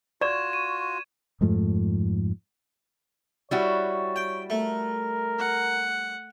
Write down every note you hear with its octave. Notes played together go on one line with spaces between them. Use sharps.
F4 F#4 D5 C#6 G#6 E7
D#7
F2 G#2 F3 A3
G3 E4 F#4 C#5
G5
A3 A#4
F#5